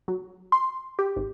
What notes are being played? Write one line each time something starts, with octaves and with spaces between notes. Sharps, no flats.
F#3
C6
G4
G#1